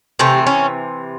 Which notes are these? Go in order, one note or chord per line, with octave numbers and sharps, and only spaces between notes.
C3 E3 A3 G4
C#4